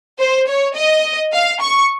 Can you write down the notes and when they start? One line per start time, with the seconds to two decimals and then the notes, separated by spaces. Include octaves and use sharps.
0.20 C5
0.48 C#5
0.76 D#5
1.33 F5
1.62 C#6